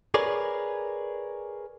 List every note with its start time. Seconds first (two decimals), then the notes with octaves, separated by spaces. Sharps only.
0.14 G#4 A#4 B4 C#5 D5